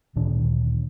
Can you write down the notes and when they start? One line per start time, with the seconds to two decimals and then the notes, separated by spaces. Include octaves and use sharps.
0.16 D2 A#2 D#3 D4